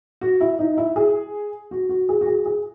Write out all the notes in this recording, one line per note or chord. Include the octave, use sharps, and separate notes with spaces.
F#4
E4
D#4
E4
G#4
F#4
F#4
G#4
F#4
G#4
G#4